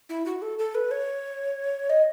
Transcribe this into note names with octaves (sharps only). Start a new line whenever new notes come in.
E4
F#4
A4
A4
B4
C#5
D#5